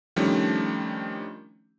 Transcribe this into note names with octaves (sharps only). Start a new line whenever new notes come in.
D#3 F3 G3 A3 C#4 D4